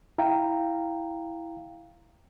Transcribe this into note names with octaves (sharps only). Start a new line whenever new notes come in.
E4 F5 G5 A#5